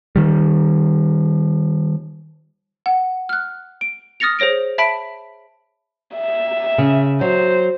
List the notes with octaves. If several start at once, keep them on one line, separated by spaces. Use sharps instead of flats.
D#3 G3
F#5
F6 F#6
D7
D#6 F6 A6 A#6 C#7 F7
G#4 C5 C#5 A#6 D7
E5 A5 B5 B6 D7
E5
C#3
F#3 C5